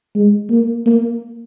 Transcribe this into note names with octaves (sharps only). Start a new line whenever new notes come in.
G#3
A#3
A#3